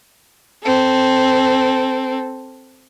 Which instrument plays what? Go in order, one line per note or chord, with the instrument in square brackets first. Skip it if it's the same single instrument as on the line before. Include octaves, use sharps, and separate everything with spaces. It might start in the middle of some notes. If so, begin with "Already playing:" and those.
[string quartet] C4 A4